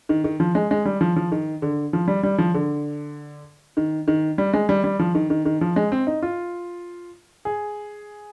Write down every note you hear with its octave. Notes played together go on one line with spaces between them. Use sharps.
D#3
D#3
F3
G#3
G#3
G3
F3
F3
D#3
D3
F3
G3
G3
F3
D3
D#3
D#3
G3
G#3
G3
G3
F3
D#3
D#3
D#3
F3
G#3
C4
D#4
F4
G#4